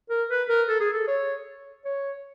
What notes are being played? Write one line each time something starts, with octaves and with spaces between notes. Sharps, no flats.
A#4
B4
A#4
A4
G#4
A4
C#5
C#5